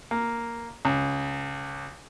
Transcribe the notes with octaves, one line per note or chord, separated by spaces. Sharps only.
A#3
C#2